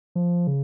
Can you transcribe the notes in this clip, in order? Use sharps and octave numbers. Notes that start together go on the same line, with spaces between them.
F3
C#3